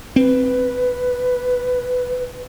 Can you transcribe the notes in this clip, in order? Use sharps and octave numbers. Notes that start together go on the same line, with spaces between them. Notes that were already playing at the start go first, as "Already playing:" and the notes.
C4 B4